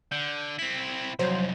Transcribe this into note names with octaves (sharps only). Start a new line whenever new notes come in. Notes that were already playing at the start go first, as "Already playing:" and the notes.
D3 G6
C4 E4 B6
C2 F2 F#3 C5